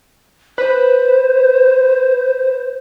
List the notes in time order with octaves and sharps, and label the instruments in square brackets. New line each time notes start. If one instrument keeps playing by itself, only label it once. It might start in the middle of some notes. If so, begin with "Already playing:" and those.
[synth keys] B4 [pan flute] C5